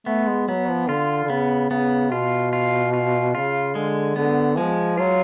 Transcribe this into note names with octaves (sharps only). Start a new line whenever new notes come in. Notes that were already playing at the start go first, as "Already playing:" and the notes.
A3 B3
G#3
F#3 B3
F3
D3 F4
D3
C#3 B3
C#3 B3
B2 F4
F4
F4
C#3 F4
D3 G#3
D3 B3
F3 G#3
F#3 F4